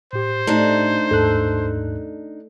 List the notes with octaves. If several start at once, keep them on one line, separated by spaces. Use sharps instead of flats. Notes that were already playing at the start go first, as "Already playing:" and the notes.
A2 G4 C5
A3 D4 D#4
D#2 G#2 A4 F#6